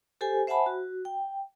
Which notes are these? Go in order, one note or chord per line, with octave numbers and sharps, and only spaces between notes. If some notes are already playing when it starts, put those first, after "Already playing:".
G4 A4 C5 G#5
C5 E5 F#5 G#5 A5 B5
F#4
G5